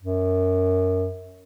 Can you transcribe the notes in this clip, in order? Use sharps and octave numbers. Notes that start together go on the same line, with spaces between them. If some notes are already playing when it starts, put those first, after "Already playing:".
F#2